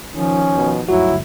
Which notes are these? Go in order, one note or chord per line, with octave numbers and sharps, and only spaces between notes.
D#3 F3 C#4
B2
G1 D2 F#3 E4 F#4